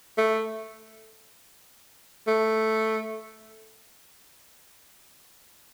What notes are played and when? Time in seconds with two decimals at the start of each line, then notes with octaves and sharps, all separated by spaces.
0.18 A3
2.27 A3